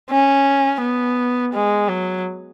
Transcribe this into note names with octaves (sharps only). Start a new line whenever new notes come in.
C#4
B3
G#3
F#3